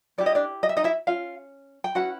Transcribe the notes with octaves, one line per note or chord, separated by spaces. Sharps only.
C#4 E4 G4 D5
D#5
D4 D5
D#5
E5
D#4 D#5
E4 E5
C#4 F4 F5
G5
C#4 E4 F#4 B4 F#5